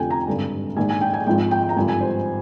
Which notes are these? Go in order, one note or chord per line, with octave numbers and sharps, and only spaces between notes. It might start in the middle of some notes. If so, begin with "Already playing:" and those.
Already playing: F1 F2 D3 F3 G5 G#5
A#5
G#1 G2 D3
A#1 G#2 D#3 G#5
G#5
G5
G#5
G#1 G#2 F3 G5
G5
A#5
G#1 G2 D3 F3 G#5
G#5
C5